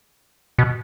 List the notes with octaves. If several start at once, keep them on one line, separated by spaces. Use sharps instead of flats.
B2